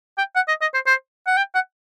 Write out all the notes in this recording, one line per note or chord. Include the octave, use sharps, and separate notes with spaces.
G5
F#5
D#5
D#5
C5
C5
F#5
G5
F#5